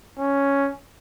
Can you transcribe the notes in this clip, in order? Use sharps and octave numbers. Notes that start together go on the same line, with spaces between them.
C#4